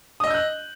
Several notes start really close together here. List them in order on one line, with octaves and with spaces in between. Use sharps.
D#6 D#5 E6 G6 F#6